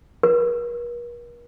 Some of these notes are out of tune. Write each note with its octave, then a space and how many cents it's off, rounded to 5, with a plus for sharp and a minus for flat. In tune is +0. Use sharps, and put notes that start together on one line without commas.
A#4 +45